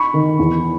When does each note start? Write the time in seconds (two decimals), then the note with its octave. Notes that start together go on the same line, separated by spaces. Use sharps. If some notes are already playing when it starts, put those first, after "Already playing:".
Already playing: B5 C#6
0.14 D#3
0.39 E2